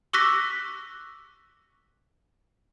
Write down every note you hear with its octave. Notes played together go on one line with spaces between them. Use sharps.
C#6 D6 E6 F#6 A#6 B6